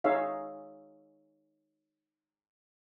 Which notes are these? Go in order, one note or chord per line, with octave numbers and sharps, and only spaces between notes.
D#4 G#4 C#5 E5 F5